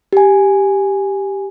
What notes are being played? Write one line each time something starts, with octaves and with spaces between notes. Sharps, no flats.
G4 G#5